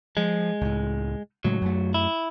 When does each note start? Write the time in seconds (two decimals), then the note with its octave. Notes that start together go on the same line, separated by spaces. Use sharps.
0.17 F3 G#3
0.61 C#2 A2
1.44 A2 C#3 F#3 G#3
1.61 F#2 A3
1.94 E4